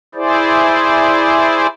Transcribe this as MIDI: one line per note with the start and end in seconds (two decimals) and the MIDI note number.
0.15 1.67 64
0.15 1.67 68
0.15 1.67 72
0.15 1.67 74